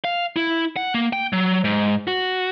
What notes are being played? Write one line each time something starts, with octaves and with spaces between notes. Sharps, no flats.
F5
E4
F#5
A#3
G5
F#3
G#2
F#4